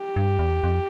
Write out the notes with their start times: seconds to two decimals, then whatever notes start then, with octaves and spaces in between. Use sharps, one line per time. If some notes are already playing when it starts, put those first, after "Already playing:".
Already playing: G4
0.16 G2
0.39 E2
0.63 F2